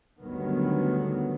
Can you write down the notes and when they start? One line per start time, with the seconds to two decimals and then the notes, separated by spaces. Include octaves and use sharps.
0.20 G1 D2 D#3 F#3 B3